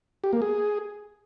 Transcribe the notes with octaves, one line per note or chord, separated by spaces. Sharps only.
G4
A#3
G#4